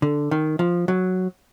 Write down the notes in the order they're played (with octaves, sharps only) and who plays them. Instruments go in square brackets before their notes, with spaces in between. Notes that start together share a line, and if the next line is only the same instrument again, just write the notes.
[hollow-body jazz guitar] D3
D#3
F3
F#3